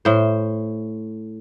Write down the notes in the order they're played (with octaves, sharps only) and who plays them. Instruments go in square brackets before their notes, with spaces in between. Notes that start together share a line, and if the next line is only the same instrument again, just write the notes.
[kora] A2 C5